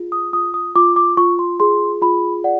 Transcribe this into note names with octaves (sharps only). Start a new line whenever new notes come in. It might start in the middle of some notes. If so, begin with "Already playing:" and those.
Already playing: F4 G#4
D#6
F4 D#6
D#6
F4 D6
D6
F4 C#6
C6
G#4 C6
F4 B5
D5 F#5